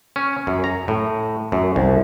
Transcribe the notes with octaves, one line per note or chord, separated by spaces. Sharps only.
C#4
F#2
A#5
A2
F#2
C2